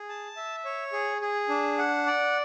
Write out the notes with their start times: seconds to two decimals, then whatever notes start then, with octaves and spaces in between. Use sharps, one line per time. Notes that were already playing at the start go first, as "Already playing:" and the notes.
Already playing: G#4
0.09 A5
0.37 E5
0.65 C#5
0.93 G#4
1.22 G#4
1.49 D4
1.78 F#5
2.06 D5